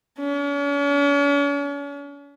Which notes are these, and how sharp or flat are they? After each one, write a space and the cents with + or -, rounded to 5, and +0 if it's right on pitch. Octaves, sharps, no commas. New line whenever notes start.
C#4 +45